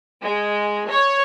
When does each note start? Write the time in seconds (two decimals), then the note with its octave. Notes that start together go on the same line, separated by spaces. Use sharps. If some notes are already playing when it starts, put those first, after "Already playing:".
0.22 G#3
0.89 C#5